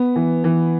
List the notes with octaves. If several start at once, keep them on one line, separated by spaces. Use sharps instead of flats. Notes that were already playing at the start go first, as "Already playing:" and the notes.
Already playing: B3
E3
E3